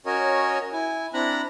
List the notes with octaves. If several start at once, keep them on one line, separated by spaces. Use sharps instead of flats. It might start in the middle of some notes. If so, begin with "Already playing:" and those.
C#4 F#4 A#4 C#5 D#5
E4 G#5
C4 D4 E4 A#5 B5 F#6